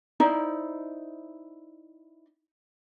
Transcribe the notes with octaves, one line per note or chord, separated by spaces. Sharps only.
D#4 E4 C5 D5